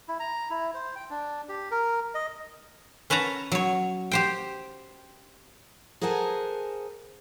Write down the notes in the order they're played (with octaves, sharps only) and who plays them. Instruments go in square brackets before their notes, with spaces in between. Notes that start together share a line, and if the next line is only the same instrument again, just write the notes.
[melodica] E4
A#5
E4
C5
G5
D4
G4
A#4
D#5
[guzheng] C#4 B4 C#5 A5 A#5
F#3 C#5
G4 C5 G5
[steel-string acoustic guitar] G#4 A#4 C5 F#5 G#5 A5